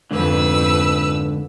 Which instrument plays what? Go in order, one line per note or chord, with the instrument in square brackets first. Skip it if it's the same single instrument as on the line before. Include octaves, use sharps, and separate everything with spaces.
[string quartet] F2 B4 E6 [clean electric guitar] G#2 D3